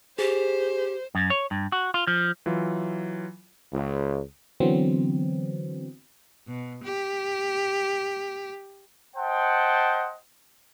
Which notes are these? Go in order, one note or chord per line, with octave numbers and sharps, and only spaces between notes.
G4 G#4 C5
F#2
C#5
G2
F#4
F4
F3
E3 F#3 F4
C#2
D3 E3 F#3 B3 C4
B2
G4
C5 D#5 F#5 G5 A5